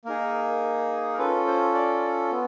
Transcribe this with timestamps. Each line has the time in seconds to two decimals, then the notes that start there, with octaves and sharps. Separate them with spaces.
0.05 A#3 D#4 G#4 A#4
1.14 A#4
1.18 C#4 F4 A4 B4
1.47 C5
1.74 D5
2.31 B3